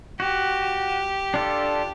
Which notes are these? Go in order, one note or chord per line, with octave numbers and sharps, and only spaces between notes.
F#4 G4
D4 F4 A4